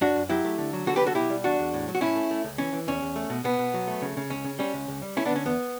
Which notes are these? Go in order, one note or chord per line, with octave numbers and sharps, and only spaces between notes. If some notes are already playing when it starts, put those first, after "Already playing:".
F#2 D4 F#4
F#2
F#3 E4 G4
A3
D3
F#3
D3 F#4 A4
G4 B4
F#3
F#4 A4
B2 E4 G4
G3
E2 D4 F#4
E2
A2
F#3
F#4
A2 C#4 E4
A3
A3
C#2
E3 C#4
E3
E2 C#4
E2
A3
B2
B2 B3
B2
F#3
A3
C#3
C#3
C#2 C#4
C#3
G3 C#4
C#2
C#2
G3
A3 C#4 E4
B3 D4
D3
C#4
E2 B3